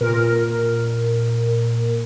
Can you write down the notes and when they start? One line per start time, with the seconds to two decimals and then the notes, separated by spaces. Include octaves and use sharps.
0.01 A#2 A#4